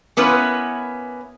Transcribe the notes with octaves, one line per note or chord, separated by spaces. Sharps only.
A#3 B3 C#4 E4 B4